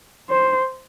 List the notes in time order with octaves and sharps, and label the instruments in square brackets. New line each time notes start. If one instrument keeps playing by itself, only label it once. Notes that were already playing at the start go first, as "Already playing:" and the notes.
[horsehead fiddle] C5